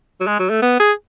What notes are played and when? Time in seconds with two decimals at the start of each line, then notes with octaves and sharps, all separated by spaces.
0.21 F#3
0.27 G#3
0.39 F#3
0.50 A3
0.62 B3
0.80 G#4